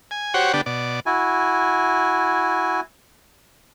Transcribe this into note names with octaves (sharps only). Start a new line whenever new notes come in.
G#5
F#4 G4 C5 C#5 F#5
D3 B3 D4 G4
B2 D5
E4 F#4 G#5